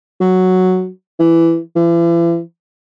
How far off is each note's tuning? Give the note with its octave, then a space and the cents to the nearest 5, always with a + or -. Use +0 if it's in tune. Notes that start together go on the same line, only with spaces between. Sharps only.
F#3 +0
E3 +10
E3 +40